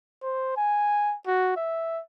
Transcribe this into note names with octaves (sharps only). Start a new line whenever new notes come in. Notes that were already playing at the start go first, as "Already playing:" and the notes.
C5
G#5
F#4
E5